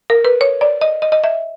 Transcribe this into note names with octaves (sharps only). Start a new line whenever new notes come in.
A#4
B4
C#5
D5
D#5
D#5
D#5
E5